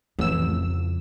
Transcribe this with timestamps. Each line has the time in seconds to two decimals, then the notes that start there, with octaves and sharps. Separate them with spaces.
0.19 A1 F2 C#3 E6